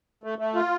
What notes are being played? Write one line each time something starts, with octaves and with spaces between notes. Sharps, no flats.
A3
A3
F4